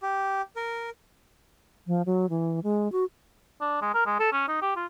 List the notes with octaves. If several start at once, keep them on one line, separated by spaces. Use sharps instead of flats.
G4
A#4
F3
F#3
E3
G#3
F#4
D4
G#3
A#4
G#3
A4
C#4
D#4
G4
F4